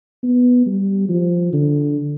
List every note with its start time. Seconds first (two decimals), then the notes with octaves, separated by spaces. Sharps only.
0.23 B3
0.66 G3
1.09 F3
1.53 D3